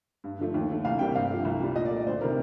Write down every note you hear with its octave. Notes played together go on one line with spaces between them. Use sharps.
G2
D3 F3 A3
D#2
D3 A3
C2 F5
C3 G3 A#3 G5
G2 F5
F3 A3
C2
A#2 G3
A#2 D#5
D5
A3
D5
D2 C5
C3 D#3 A3 A#4